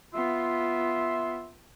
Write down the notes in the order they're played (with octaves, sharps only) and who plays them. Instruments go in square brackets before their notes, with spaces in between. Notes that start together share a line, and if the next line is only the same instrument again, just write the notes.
[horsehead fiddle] B3 F4 [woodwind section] E5 C6